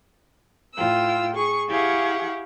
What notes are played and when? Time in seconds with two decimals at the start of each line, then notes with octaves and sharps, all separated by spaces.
0.74 A2 F4 G5 E6
1.35 G#4 C#6
1.69 E4 G4 G#4 F5 F#5 C#6